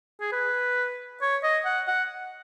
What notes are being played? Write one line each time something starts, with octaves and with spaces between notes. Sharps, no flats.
G#4
B4
C#5
D#5
F#5
F#5